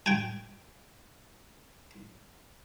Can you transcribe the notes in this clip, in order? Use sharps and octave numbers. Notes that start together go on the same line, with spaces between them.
G5 G#5